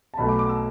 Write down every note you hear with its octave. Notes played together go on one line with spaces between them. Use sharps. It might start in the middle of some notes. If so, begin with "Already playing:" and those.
A5
B1 B2 A3 B5
D6
D6
E6